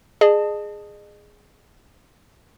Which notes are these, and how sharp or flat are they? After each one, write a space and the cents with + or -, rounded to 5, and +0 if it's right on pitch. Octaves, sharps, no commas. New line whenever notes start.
G#4 +0 D#5 -40 A5 +0